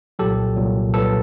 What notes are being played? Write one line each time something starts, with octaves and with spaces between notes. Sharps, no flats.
C2 A#2 F#3 G4 A4
C2 A#2 F#3
C2 A#2 F#3 A4 B4